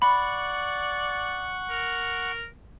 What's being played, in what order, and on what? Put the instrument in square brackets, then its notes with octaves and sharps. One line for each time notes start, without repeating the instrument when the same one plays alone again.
[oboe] D5 [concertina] F#5 C#6 [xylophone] B5
[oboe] A#4